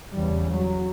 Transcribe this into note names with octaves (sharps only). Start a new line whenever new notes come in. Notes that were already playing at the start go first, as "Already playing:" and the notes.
E2 C#3 G3
F#3